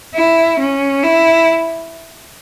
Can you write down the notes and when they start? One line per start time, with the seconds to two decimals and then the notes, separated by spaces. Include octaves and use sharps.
0.15 E4
0.59 C#4
1.04 E4